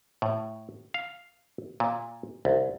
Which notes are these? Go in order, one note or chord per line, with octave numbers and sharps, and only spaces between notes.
A2
F5
A#2
C2